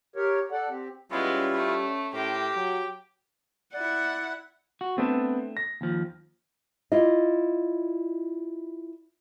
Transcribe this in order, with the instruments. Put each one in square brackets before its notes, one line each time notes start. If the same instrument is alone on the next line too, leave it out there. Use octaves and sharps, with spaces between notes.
[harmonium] G4 A#4 C#5
A4 D5 F#5
C4 G4
[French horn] G3 [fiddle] G#3 B3 [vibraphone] C#4 C#5 [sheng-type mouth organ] E4 F4
[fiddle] A3
[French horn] A2 [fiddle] G4 [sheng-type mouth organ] A#4 C5
[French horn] F#3 [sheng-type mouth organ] G5
[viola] E4 F#5 [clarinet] D5
[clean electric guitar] F#4
[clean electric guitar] A3 D4 [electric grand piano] B3 C4
[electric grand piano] A#6
[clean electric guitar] D#2 F3
[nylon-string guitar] E4 F4 D5 D#5